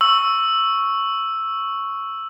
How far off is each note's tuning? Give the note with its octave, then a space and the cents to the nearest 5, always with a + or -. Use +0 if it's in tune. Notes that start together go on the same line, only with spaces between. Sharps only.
C#6 +0 E6 +0